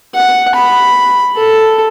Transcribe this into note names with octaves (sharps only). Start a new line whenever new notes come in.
F#5
B5
A4